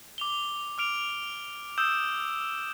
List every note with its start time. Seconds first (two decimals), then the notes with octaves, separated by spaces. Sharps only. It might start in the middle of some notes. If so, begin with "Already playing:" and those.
0.18 D6 F7 G7
0.78 D6 F6 D7 F7
1.78 D#6 E6 G6 E7